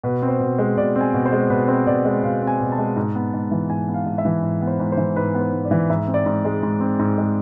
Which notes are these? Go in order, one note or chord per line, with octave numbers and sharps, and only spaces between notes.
B2 B4
C4
C5
B2
G#3
B2 D5
C4
G#5
B2
C5
G#3
B2 B4
C4 C5
B2 D5
G#3
B2 F5
C4
G#5
B2
A5
G#3
G#2
B3
G#2
E3
G#2 G#5
B3
F5
G#2
E5
E3
G#2
B3
C5
G#2
C5
E3
G#2 B4
B3
C5
G#2
D5
E3
G#2 E5
C4
D5
G#2
G#3
G#2
C4
G#2
G#3